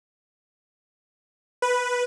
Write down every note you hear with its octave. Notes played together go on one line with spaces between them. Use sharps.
B4